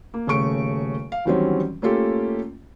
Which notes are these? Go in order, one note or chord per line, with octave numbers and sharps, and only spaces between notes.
A#3
D#1 C#3 A3 C#6 D7
F5
E2 D#3 F#3 G3 C4 C#4
A3 A#3 C#4 F4 G4 A4